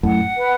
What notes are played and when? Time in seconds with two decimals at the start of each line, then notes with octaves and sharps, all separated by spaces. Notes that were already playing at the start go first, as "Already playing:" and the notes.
0.03 F#2 A2 F#5
0.37 B4